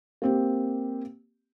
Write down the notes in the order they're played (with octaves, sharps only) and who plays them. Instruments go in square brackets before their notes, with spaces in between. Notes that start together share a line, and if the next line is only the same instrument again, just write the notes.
[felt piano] A#3 C4 G4